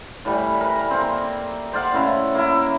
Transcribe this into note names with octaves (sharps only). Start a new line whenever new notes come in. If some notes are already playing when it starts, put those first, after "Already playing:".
A2 E3 G3
A#4 B4
A#3 C4
C5 D5 F5 F#5
A2 C#3 E4 A#5
A#3 E4